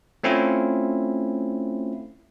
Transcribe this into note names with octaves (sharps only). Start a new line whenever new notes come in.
A3 C4 C#4 E4 F4